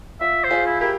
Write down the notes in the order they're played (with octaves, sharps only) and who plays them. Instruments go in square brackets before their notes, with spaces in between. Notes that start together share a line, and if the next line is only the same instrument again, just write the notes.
[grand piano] F4 [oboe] E5
[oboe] C5
[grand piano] F4 G#4
[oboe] E4
[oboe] E4 [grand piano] G4 A#4